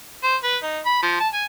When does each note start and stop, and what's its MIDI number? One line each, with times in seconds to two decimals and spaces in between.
0.23 0.36 72
0.44 0.57 71
0.63 0.80 63
0.85 0.98 83
1.03 1.16 53
1.20 1.28 81
1.33 1.45 80